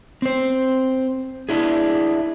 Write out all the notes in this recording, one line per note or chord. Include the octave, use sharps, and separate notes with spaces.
C4 C5
D4 E4 G#4